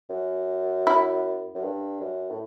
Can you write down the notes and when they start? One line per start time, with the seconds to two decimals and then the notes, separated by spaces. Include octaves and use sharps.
0.10 F#2
0.87 E4
1.55 F#2
1.62 G2
2.00 F#2
2.30 A2